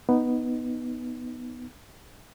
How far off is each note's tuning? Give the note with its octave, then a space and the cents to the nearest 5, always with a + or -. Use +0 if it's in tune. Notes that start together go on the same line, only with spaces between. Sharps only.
B3 +0 D#4 +0